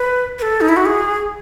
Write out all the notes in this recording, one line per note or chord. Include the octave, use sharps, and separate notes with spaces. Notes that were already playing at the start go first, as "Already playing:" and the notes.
Already playing: B4
B4
A4
D#4
E4
F#4
G#4